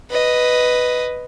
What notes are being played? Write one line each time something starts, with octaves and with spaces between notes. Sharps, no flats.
B4 D#5